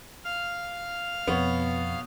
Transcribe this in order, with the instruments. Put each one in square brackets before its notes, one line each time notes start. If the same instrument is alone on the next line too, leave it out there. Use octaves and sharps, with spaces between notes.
[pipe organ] F5 F6
[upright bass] F2 [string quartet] B2 [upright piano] B3 C#5